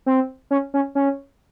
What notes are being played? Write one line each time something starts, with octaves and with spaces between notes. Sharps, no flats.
C4
C#4
C#4
C#4